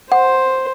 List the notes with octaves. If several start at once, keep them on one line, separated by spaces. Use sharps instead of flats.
C5 F#5